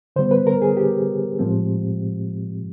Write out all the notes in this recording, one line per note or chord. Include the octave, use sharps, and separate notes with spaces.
D3 G3 B3 C5
B4
A#4
G#4
G4
A2 F3 G#3 C4